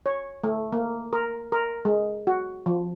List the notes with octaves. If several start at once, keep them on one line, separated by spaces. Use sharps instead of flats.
C#5
A3
A#3
A#4
A#4
G#3
F#4
F3